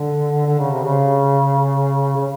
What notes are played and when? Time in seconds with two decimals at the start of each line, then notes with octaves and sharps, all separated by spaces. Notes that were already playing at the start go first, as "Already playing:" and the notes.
Already playing: D3
0.46 D3
0.59 C#3
0.71 C3
0.84 C#3
2.16 C#3